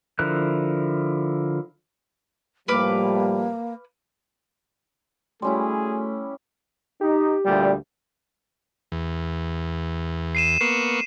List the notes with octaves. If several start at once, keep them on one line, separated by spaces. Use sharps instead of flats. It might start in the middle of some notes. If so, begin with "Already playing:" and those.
D3 F3 E4 A#4 F#6
A2 F3 G3 A#3 B4 F5 D6
G3 A3 C#4 E4 F#4 G#4 C6
D#4 G4
D2 A#2 G3
E2
C7 D#7 E7
A#3 B3 C#6 C7